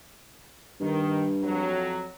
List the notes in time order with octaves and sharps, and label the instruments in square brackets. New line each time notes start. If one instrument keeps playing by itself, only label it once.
[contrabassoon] G2 [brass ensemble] D#3
[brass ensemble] F2 F#3